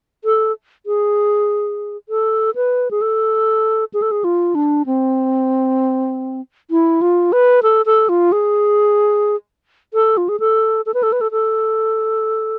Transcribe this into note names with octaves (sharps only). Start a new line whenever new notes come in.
A4
G#4
A4
B4
G#4
A4
G#4
A4
G#4
F4
D4
C4
E4
F4
B4
A4
A4
F4
G#4
A4
F4
G#4
A4
A4
B4
A4
B4
A4
A4